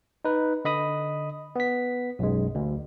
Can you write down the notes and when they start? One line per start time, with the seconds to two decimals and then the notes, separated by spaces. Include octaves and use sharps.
0.25 D#4 B4
0.65 D3 D#5 B5 D#6
1.56 B3 B6
2.19 B1 F#2 G#3
2.55 D2